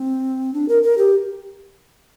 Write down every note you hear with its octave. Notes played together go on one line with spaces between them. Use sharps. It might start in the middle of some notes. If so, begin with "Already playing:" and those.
Already playing: C4
D4
A#4
A#4
G4